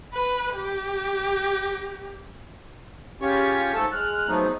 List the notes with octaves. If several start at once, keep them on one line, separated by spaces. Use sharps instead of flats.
B4
G4
C#3 C#4 F4 G4 C#5 C#6
G#2 A3 A4 A5
G#3 F6 F#6
F3 F#3 G#3 A3 B3 D#4